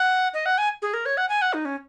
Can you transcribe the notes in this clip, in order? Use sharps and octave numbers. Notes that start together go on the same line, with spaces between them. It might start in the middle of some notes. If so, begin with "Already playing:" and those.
Already playing: F#5
D#5
F#5
G#5
G#4
A#4
C#5
F#5
G#5
F#5
D#4
C#4